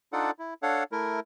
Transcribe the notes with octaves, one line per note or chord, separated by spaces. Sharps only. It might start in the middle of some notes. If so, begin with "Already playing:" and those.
D4 D#4 F4 A4 D5 F#5
E4
D4 A4 C#5 F5 F#5
A3 E4 A#4